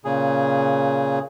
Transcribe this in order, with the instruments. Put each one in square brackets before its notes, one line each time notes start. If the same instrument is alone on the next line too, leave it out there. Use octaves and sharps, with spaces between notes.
[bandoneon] A#2 C#3 G#4